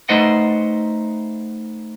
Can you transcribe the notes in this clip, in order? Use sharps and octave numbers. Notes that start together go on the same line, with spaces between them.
A3 D#4 B4 C5 D#5 F#5